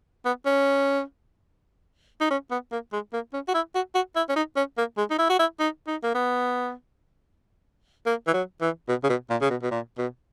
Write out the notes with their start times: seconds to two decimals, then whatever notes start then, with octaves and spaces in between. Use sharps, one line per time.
0.25 B3
0.46 C#4
2.21 D#4
2.31 C#4
2.51 B3
2.72 A#3
2.93 G#3
3.13 A#3
3.33 C#4
3.48 F#4
3.54 E4
3.75 F#4
3.95 F#4
4.16 E4
4.29 C#4
4.36 D#4
4.56 C#4
4.78 A#3
4.97 G#3
5.10 D#4
5.19 E4
5.29 F#4
5.39 E4
5.60 D#4
5.87 D#4
6.03 A#3
6.14 B3
8.06 A#3
8.27 E3
8.34 F#3
8.61 E3
8.88 B2
9.03 C#3
9.09 B2
9.30 A#2
9.41 C#3
9.50 B2
9.62 B2
9.71 A#2
9.98 B2